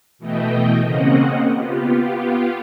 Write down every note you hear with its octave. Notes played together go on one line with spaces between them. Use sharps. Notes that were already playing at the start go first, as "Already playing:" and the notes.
B2 E3 A3 D#5 G5
C#3 A#3 C4 C#4 D#5 F#5
B3 F4 G4